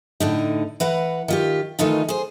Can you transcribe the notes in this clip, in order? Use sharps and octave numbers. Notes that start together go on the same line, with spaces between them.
A2 D3 D#4
E3 B4 F#5 A#5
D#3 F4 G4
D#3 E3 A3 D#4 F4
G#4 C5